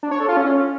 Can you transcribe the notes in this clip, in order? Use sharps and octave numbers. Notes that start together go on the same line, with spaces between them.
D4
C#5
A4
F4
C#4